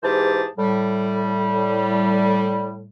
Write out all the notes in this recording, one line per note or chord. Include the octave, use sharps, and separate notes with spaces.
G#2 E3 G4 G#4 C5 A5
A2 G3